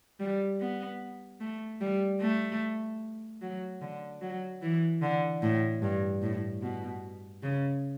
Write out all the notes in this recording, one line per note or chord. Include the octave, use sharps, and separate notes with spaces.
G3
B3
A3
G3
A3
F#3
D3
F#3
E3
D3
A2
G2
A2
B2
C#3